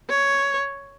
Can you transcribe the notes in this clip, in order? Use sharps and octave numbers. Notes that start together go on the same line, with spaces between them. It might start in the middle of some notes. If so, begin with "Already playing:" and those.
C#5